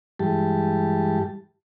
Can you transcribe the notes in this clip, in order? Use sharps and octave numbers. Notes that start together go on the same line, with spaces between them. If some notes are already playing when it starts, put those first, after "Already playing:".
G2 E3 G3 G#3 G4 A5